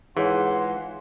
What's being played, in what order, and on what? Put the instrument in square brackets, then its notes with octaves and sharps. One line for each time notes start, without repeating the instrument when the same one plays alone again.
[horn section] G#2 F4 C6 [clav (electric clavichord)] E3 [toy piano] G#4 A#4 C#5 [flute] F#5